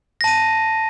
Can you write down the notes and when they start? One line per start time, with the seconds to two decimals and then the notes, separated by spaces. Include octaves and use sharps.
0.21 A#6
0.24 A5
0.27 D#7